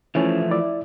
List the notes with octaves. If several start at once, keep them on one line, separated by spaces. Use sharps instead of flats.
E3 F3 A3 C#4 E4
E4 D5 E5